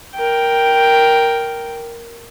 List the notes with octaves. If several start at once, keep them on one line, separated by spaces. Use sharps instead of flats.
A#4 G5